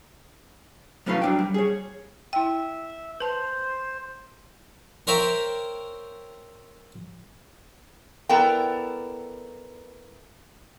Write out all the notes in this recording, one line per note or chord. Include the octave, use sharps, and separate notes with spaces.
F#3 A3 C#4 E4 B4 F5
F#3 D4 G5
G3
G#4 C#5
E4 E5 G5
B4 C5 A5
A#4 C5 C#5 E5 G5 A#5
B3 E4 A4 A#4 D5 G5